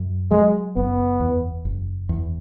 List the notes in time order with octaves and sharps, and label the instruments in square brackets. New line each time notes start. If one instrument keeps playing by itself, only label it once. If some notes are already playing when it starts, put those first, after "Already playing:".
Already playing: [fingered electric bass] F#2
[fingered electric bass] F#3 [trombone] G#3
[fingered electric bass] F#1 [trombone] B3
[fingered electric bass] E2
F#1
E2